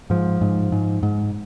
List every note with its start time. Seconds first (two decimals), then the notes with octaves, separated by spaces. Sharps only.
0.10 G#2 F3
0.41 G#2
0.72 G#2
1.03 G#2